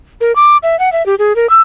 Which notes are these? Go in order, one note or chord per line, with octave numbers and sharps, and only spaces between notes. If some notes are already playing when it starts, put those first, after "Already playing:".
A#4
D6
E5
F#5
E5
G4
G#4
A#4
E6